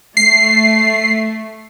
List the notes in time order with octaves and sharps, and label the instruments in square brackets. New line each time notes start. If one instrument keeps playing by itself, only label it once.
[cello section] A3 [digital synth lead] C7